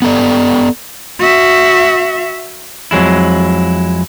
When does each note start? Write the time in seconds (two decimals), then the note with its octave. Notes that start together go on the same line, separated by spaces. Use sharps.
0.02 B3 A4 D5
1.20 F#4 E5
2.91 F2 F#3 G#3 E4